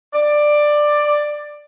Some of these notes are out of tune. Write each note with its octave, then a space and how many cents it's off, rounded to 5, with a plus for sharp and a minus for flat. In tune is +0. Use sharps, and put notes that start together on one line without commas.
D5 +10